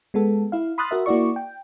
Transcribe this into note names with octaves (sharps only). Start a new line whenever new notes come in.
G#3 B3 A4
E4 F5
B5 C6 D#6 F6 F#6 A6
F#4 A#4 E5
A#3 E4 F#4 D5 C#6
G5